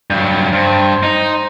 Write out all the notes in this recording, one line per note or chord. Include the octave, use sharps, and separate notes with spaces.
G2 F#3
G2 C5
D#4